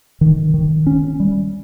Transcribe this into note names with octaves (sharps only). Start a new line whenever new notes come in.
D#3
D#3
C#4
G3